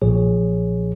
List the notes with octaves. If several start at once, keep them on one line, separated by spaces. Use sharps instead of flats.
B1 A#2 F3 G#4 C#5